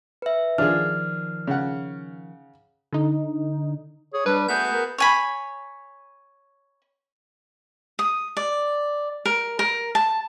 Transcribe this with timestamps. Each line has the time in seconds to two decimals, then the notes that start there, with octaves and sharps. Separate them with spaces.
0.22 B4 E5
0.58 D#3 F3 D4 F4 G#4 F6
1.47 C#3 F#5
2.93 D3 D#4
4.14 G#4 C#5
4.26 G3 D4 B4
4.49 A3 B3 F#4 G#4 B4 G6
4.72 A#4
4.98 C#5 G#5 B5
7.99 D#6
8.37 D5
9.25 A#4
9.59 A#4
9.95 A5